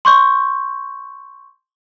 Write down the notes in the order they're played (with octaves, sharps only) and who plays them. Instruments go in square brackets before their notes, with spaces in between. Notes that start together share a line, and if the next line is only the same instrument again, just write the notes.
[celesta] C6 C#6 G6